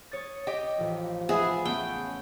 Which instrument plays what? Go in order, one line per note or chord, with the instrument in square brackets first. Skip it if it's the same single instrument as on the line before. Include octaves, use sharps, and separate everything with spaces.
[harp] C#5 D#6 A6
[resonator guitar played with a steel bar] G4 D#5 G5
[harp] A1 [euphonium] F3
[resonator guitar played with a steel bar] B3 E5 [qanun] G#4 [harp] B4 B5
[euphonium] C#3 [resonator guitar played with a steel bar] A3 [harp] B3 [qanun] G5